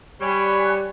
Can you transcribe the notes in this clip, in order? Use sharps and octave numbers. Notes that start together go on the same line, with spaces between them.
G3 C#5 G#5 B5 F#6